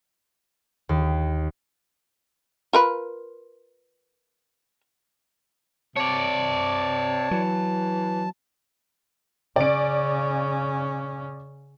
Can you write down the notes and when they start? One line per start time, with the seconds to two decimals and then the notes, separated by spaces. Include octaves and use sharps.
0.89 D#2
2.73 F4 A#4 B4
5.96 C3 C#5 D5 A5
7.31 E3 F#3
9.56 C#3 C#4 D5 D7